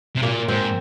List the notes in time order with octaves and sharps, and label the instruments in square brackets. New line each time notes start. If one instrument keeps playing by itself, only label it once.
[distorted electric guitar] C3
[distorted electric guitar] A#2 [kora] A#3
[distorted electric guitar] G#2 [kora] C4